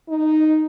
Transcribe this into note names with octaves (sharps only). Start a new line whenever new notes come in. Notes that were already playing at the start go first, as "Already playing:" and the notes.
D#4